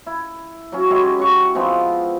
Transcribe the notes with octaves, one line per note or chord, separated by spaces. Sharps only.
E4
F#3 C#4
G#3 C#4 E4 G4
C#4 F#4 C#6
F3 G#3 B3 C4